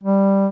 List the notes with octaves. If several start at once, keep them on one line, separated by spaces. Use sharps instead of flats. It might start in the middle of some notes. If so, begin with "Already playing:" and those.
G3